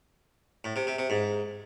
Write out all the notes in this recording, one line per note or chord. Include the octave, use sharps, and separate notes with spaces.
A2
C3
C3
C3
G#2